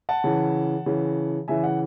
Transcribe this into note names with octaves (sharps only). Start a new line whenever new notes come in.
F#5 A5
C#3 E3
C#3 E3
C#3 E3 E5 G#5
F#5